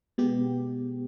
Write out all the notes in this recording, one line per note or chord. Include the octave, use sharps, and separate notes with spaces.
B2 G#3 B3 G4